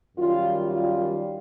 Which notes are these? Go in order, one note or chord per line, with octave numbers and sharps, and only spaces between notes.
F#2 D#3 G3 F4
F4